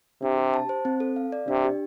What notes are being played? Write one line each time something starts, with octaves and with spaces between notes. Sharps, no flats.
C3 D4
G4
A5
C5
C4
A4
F5
D5
C3 D4
G4